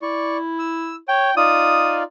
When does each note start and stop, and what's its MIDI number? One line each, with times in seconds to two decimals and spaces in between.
0.02 0.98 64
0.02 0.37 74
0.02 0.37 85
0.59 0.96 88
1.08 1.30 73
1.08 1.33 79
1.37 2.03 63
1.37 2.03 65
1.37 2.03 74
1.37 1.98 87